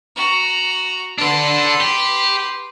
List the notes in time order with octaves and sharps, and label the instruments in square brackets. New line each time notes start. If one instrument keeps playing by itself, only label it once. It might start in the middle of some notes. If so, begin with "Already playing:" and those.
[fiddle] F#4 A#5
[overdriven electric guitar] D4 A4 [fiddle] B4 C6
[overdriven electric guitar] G4